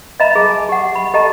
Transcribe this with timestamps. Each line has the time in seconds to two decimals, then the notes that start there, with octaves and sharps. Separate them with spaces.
0.20 D#5 E5 A#5 B5
0.35 G#4 A5
0.50 G#5
0.69 G4 F#5
0.95 B5
1.14 G4 A4 D#5 A5 A#5